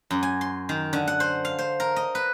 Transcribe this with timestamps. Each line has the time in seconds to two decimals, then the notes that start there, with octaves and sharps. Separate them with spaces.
0.11 F#2
0.23 G#5
0.41 C6
0.69 D#3
0.93 D3
1.07 F#5
1.20 C5
1.45 F5
1.59 C5
1.80 A#4
1.96 D#5
2.15 B4